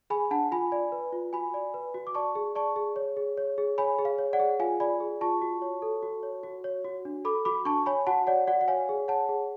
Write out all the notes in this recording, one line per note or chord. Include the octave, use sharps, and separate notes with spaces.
G#4 G#5 B5
D4 F#5 A5
F4 G#5 B5
D5
B4
F4
F#4 G#5 B5
D5
B4
F#4
D6
D5 A5 C#6
G#4
D5 A5 C#6
G#4
C#5
G#4
C#5
G#4
C#5 G#5 B5
G#4
F5
C#5
D5 F#5
G#4
F4 F5 G#5
D5 G#5 B5
G#4
F4 A5 C#6
F#4
C#5
A4
F#4
C#5
F#4
C#5
F#4
D4
A4 B5 D6
F#4 B5 D6
D4 A5 C#6
C#5 G#5 B5
F#4 F#5 A5
C#5 D5 F#5
F#4 D5 F#5
F#5
C#5 F5 G#5
G#4
C#5 F#5 A5
G#4